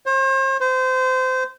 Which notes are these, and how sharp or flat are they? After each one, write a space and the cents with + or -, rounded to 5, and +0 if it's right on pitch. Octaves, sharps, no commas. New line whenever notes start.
C5 +40
C5 -25